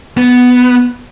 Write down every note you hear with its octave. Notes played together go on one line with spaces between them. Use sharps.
B3